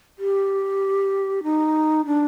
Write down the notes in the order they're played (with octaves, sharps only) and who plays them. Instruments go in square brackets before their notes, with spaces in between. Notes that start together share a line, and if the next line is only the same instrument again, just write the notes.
[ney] G4
D#4
D4